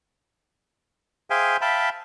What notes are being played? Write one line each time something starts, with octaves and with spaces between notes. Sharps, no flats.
G#4 C5 E5 F5 G5 G#5
E5 F5 G5 A5 B5